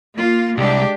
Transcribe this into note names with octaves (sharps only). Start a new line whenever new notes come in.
A#3 F4
C2 G#3 D4 G4